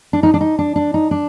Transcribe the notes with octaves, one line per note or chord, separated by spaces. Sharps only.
D4
D#4
D4
D#4
D4
D4
D#4
D4